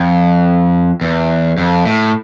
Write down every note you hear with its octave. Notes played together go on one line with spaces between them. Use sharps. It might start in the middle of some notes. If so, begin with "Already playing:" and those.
Already playing: F2
E2
F2
A2